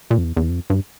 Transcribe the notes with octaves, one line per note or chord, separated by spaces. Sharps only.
A#2
F2
E2
E2
F2
G2